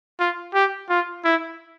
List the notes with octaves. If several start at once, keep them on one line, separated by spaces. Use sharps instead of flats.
F4
G4
F4
E4